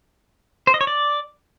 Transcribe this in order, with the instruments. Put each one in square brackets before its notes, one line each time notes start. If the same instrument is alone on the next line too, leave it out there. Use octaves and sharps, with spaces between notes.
[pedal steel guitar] C5
D#5
C#5
D5